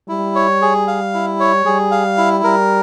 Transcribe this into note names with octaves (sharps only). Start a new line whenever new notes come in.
G3 E4
C#5
G#4
F5
E4
C#5
G3 G#4
F5
E4
G3 A#4